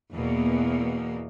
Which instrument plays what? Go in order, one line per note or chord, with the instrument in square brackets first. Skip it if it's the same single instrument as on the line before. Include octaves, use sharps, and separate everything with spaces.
[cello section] E2 B2 A#3